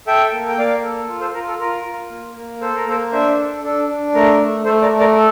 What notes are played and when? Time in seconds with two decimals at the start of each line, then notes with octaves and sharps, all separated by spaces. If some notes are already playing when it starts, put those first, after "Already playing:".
0.07 A4 E5 G5
0.33 A#3
0.48 G5
0.58 A#3 D5 F5
0.83 A4
1.09 F4
1.21 A4 C5
1.34 F4 A#4
1.48 A4
1.60 F4 A#4
1.85 F4
2.10 A#3
2.36 A#3
2.61 A4 C5
2.76 A#4
2.86 A#3 A4 C5
3.12 D4 C5 E5
3.37 A4
3.64 D4 A4
3.88 D4
4.14 A3 A#4
4.40 A3
4.65 A3 A4 C5
4.82 A#4 D5
4.90 A3
4.99 A#4 D5
5.16 A4